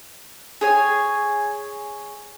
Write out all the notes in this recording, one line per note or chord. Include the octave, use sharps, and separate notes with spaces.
G#4 C#5 G#5